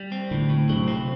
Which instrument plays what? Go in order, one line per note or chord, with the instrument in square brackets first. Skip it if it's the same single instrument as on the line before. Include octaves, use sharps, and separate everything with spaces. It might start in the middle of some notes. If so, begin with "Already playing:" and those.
Already playing: [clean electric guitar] G3
C4
[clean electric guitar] A2 [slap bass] D3
[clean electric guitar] A2
[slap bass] C3 [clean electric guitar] F#3
[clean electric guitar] C4